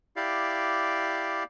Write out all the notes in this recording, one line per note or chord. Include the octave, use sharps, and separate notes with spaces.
E4 G4 D5 F5